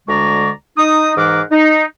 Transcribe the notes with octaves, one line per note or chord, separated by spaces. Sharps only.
D2 D3 G#3 D5 A#5 C#6
D#4 D#6
G#2 E3 G#4 A#4 F#5 D6
D#4